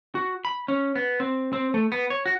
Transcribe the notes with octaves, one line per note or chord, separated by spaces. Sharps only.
F#4
B5
C#4
B3
C4
C4
A3
B3
C#5
F#4